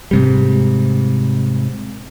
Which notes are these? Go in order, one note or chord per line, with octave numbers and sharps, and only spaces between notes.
G#2 C3 G3